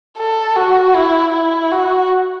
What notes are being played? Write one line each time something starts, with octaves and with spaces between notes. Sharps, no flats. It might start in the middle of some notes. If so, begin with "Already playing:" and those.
A4
F#4
E4
E4
F#4